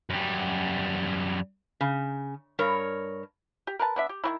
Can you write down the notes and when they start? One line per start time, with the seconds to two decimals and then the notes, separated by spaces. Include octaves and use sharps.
0.10 F#2 G3
1.81 C#3
2.59 G2 A#4 C#5
3.67 G4
3.79 A#4 B4 A5
3.96 B3 D4 E5
4.09 G4
4.24 D#3 C4 E4